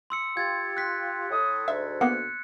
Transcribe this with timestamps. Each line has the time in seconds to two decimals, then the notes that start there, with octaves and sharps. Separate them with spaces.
0.10 C6 E6 C#7
0.37 F4 G4 G#6 A6
0.77 F#6 B6
1.31 A2 D#6
1.68 D2 G#2 E5
2.01 A#3 B3 F#6 C#7